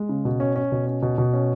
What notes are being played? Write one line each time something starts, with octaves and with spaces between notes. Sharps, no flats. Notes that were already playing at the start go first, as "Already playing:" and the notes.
Already playing: G#3
C#3
B2
C#4
C#4
B2
C#4
B2
B2
C#4